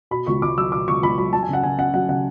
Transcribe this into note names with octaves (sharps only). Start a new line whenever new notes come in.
B2 B5
C#2 C#6
C#2 D6
F#3 E6
B2 D6
C#2 C#6
C#2 B5
F#3 B5
F#3 A5
G#5
C#3 F#5
C#3 G#5
C#4 F#5
F#3 F#5
C#3 F#5